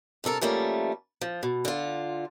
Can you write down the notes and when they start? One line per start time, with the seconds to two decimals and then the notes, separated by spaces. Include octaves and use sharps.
0.24 G2 C3 A4 A#4
0.41 F3 G3 A3 A#3 C#4
1.21 F3
1.43 B2
1.65 D3 F4